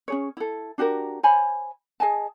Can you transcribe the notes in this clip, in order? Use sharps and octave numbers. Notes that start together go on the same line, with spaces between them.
C#4 G#4 C#5
E4 A4
D4 F#4 G4 A#4
C5 C#5 G#5 B5
G#4 D#5 G#5 A5